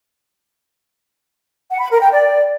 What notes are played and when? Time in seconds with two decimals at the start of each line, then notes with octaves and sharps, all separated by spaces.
1.69 F#5
1.80 B5
1.90 A#4
2.01 G5
2.12 D5